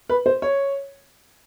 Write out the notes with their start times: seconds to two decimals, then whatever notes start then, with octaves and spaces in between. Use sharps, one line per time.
0.09 B4
0.26 C5
0.42 C#5